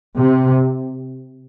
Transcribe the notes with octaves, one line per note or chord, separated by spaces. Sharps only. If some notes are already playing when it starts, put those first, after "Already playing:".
C3